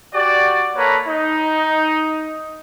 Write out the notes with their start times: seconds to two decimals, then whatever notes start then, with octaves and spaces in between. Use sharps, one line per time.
0.13 F#4 G4 D5
0.75 A#3 A4 B4 C#5 A#5
1.07 D#4